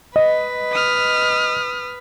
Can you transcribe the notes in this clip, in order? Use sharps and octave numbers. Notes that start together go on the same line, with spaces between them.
B4 D#5
D#6 F6